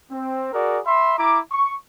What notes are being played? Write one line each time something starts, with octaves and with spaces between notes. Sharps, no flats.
C4
F#4 G#4 A#4 D5
E5 B5 C6
E4 A#5 D6
C#6